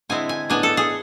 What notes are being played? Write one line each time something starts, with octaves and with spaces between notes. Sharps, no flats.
D3 G#3 C4 E4 G#5
G#5
A2 G#3 B3 D4 G#5
A4
G#4